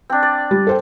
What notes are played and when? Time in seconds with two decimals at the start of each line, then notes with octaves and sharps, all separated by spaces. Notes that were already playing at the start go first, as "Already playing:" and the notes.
0.10 C4 D4
0.23 D5
0.51 G3
0.67 A4 C5 G5